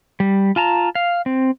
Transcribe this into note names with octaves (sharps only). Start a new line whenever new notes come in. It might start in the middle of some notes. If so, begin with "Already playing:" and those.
G3
F4 A5 A#5
F5
C4